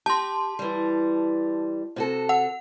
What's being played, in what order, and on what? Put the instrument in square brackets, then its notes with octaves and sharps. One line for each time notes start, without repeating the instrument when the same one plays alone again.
[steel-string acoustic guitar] G4 [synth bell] A5 C6
[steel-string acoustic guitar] E3 G3
C3 F#4 A4
[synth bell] F#5